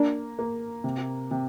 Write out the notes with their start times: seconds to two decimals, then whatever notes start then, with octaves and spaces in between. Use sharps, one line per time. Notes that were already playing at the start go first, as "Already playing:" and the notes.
Already playing: A#3 D4
0.39 A#3
0.84 C3
1.31 C3